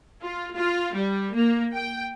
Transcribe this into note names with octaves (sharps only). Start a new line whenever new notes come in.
F4
F4
G3
A#3
G5